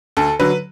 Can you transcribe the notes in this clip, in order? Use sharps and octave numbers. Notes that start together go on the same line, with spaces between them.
D2 A4
D3 F#3 B4